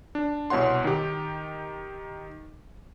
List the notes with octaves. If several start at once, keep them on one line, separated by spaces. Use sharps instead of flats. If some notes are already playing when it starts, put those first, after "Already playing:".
D4
C2 B2 C#5 F#5 C6
D#3 G4